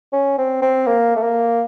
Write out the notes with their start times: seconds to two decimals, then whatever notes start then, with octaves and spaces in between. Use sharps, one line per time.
0.13 C#4
0.38 C4
0.62 C4
0.87 A#3
1.16 A3
1.23 A#3